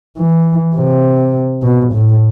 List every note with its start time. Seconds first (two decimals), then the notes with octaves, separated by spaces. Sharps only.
0.17 E3
0.76 C3
1.63 B2
1.93 A2